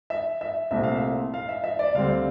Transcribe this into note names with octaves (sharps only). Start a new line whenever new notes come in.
E5
E5
C2 A#2 A3 C4 E5
F5
E5
F5
E5
E5
D5
D2 D3 G3 C4 F5